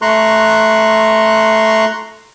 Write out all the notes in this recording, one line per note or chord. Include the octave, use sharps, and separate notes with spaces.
A3 A#5 C6 C#6 F#6